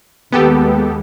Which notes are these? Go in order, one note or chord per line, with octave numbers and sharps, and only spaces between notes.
D#2 G#3 B3 G4 A4